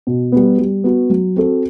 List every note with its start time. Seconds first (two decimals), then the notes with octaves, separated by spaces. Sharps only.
0.07 B2
0.32 G3 B3
0.58 G3
0.84 B3 F#4
1.10 F#3
1.36 C4 F#4 A4